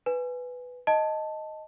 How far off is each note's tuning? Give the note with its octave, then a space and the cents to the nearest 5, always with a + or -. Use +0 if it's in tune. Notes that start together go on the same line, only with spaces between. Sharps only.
B4 +5 G#5 +0
D#5 +0 A5 +0